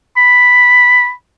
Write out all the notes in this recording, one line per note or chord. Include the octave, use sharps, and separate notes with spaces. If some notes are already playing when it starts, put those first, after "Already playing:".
B5